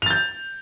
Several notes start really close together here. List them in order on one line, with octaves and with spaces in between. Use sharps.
F7 A6 G6